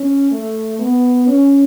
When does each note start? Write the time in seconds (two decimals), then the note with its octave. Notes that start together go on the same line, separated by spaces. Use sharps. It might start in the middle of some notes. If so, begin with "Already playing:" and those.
Already playing: C#4
0.31 A3
0.80 B3
1.28 C#4